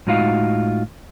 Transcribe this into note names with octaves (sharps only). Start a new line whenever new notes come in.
A2 G#3 D#4 F4 F#4 F5